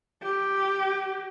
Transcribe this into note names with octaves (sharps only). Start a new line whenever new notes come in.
G4